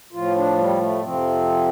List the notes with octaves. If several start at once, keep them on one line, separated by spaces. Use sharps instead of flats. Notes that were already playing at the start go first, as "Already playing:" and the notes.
A2 F3 F4
D4
G3
A3
F2 C3 F3 C4